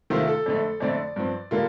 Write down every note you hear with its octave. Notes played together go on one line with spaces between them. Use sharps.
C3 D#3 A3 C4 F4
A4
F2 D3 A3
F2 D3 A3 C4 D5
G2 F3 C4
D3 G3 A#3 F4